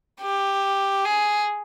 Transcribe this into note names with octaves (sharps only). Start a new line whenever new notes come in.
G4
G#4